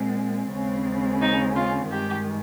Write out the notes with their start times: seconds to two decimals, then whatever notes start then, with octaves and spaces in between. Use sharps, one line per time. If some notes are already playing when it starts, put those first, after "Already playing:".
Already playing: A#2 G#3 C4
0.51 D#2 C#3 G#3 C4
1.20 D#4
1.55 F4
1.89 G2 D#3 G#3 G4